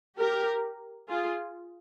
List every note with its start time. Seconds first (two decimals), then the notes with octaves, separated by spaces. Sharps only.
0.18 G4 A#4
1.10 F4 G#4